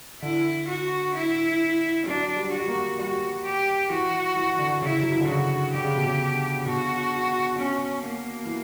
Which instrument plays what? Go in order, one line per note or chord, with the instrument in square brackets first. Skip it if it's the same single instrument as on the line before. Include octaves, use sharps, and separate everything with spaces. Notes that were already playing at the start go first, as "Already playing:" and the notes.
[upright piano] D3 [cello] E4
[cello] F#4
E4
[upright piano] F#3 [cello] D4
[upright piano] G3
[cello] F#4
[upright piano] G3
A#3
[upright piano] G3 [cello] F#4
[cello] G4
[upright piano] E3 [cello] F#4
[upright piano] E3
D3
[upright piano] C#3 [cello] E4
[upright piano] F#3
E3
D3
[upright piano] C#3 [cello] F#4
[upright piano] D3 [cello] G4
[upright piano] C#3
B2
C#3
[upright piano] B2 [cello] F#4
[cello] C#4
A#3
[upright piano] E3